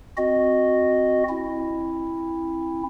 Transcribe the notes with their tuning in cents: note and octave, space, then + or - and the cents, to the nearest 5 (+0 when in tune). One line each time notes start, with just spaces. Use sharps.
C4 +0 F#4 -5 D#5 -10
C4 +30 E4 +0